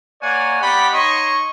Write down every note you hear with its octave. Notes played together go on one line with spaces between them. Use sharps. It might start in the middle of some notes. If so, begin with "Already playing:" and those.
A#3 C#5 D5 F#5 G#5
B3 G4 D5 F#5 B5
D#4 C#5 D#5 C6 C#6